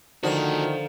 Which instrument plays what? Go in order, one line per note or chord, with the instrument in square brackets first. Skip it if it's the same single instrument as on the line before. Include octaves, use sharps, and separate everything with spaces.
[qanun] D3 [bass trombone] D#3 [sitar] F3 [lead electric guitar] F#4 A4